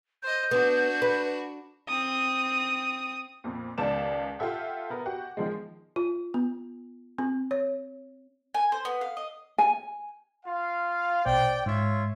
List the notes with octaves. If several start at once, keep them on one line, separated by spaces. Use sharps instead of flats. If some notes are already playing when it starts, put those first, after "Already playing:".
C5 D#5 G6
B3 D4 F#4
B4
C4 D#6
F2 A#2
C#2 D#3 D5 A5 D6 E7
F4 G4 A4 E5 F#5
B3 A#4
F#4 G4 F#5
D#3 F3 G#3
F4
B3
C4
C#5
G#5
C5
B3
F5
D#5
G#5
F4 F5
A#1 B2 C5 D5 G5
G#2 F4 C#5 E5